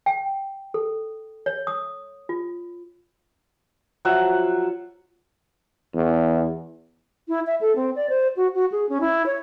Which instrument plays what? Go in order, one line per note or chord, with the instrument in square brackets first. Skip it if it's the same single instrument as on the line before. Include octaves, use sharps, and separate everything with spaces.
[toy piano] G5
A4
C#5
D#6
F4
[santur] F3 F#3 E5 F#5
[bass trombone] E2
[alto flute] E4
E5
A4
C4
D5
C5
F#4
F#4
G#4
C#4
E4
C#5